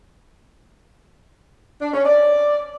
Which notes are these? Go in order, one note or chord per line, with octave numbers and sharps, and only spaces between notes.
D4
C#4
D5